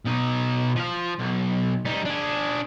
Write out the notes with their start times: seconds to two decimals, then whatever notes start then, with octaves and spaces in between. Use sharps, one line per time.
0.06 B2 D#4
0.76 F3 F5
1.19 B1
1.85 G3 D#4
2.05 D4 G#4